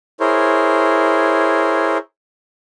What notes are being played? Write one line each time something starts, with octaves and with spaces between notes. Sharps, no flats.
E4 G#4 A#4 C5 C#5